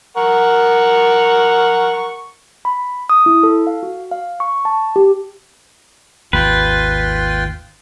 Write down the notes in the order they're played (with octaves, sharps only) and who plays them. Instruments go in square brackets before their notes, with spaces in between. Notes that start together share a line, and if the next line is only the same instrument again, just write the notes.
[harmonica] A#4 F#5 C#6
[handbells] B5
D#6
E4
A4
F5
F#4
F5
C#6
A5
G4
[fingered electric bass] G#1 D#2 [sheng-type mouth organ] F4 G5 C6 [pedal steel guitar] B4